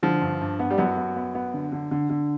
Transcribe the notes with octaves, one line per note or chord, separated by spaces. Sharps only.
D3 F3
G2
G2
B3
G3
F#2 F#3 B3
B3
B3
B3
D3
D3
D3
D3